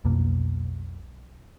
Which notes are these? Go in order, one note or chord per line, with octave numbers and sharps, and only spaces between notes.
B1 F2 B2 A#3